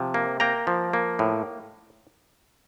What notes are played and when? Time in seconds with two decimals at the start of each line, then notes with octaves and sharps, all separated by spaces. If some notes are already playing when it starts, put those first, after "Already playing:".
Already playing: C3 F3
0.14 A#3
0.40 A#3 G5 A#5
0.67 F3
0.93 A#3
1.19 A2